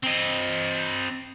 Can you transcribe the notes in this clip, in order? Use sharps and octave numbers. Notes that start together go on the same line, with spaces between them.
C4 D#5